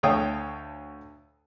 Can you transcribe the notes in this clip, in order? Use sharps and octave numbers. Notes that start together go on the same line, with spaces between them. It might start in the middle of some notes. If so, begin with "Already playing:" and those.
D2 A4 C#5 F5 G5 D#6